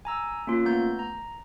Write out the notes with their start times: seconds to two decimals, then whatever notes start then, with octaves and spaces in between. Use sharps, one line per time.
0.05 G#5 A#5 E6
0.47 A#3 C#4 F4
0.65 A3 B3 A#5 G6
0.99 A#5